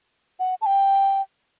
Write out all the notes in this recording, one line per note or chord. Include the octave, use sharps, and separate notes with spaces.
F#5
A5
G5